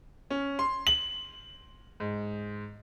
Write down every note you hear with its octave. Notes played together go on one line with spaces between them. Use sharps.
C#4
C6
F#7
G#2